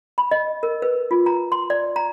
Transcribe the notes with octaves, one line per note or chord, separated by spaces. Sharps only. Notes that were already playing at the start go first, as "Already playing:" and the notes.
B5
D#5
A#4
B4
F4
A#5
C6
D5
A#5